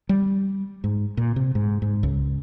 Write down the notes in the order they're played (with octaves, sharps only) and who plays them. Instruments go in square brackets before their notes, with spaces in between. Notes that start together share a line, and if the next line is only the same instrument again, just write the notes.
[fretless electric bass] G3
G#2
A#2
C3
G#2
G#2
C#2